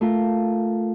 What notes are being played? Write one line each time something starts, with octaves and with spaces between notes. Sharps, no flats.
A3 F4 A#4